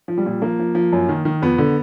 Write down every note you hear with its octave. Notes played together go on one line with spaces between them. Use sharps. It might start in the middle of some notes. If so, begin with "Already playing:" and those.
F3
G3
A#2
F3 A#3
F3
F3
F#2
D#3
D#3
F2 B3
D3